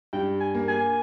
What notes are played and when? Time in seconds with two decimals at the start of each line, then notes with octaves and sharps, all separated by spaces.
0.13 G2 G5
0.40 G#5
0.55 A#3
0.68 G#5